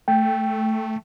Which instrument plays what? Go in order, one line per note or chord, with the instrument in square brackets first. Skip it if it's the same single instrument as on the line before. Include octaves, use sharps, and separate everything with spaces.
[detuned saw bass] A3 [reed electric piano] G5